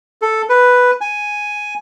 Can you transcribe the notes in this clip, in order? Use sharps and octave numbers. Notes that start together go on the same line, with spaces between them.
A4
B4
G#5